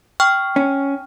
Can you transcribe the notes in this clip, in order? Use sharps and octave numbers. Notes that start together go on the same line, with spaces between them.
G5 C#6 F6
C#4